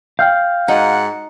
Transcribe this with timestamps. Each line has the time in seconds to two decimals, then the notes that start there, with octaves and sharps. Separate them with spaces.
0.19 F5 G5 F6 G6
0.68 G#2 D#4 F#4 F#5